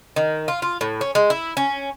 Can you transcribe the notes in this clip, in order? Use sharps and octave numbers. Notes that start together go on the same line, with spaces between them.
D#3
F4
F4
A2
C#4
G#3
E4
C#4